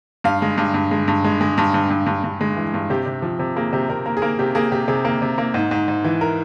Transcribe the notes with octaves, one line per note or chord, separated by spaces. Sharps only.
G2 F5
G#3
G2
G2
G#3
G2
G#3
G#3
G2
G2
G2
G2
G2
G#3
E3
G2
C3 G4
C3
F3
C3
A#3 G#4
C3 G4
C3 A#4
A#3 A#4
G#4
A#3 A#4
C3 G4
A#3 G#4
C3 G4
C3 G#4
A#3
C3
A#3
G#2
G#2
G#2
E3
A#4